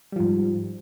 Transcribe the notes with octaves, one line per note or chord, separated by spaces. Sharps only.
G#2 F3 G3